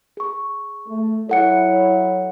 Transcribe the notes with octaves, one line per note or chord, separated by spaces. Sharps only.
G#4 C#6
A3
F#3 E4 A4 C#5 F#5 C#7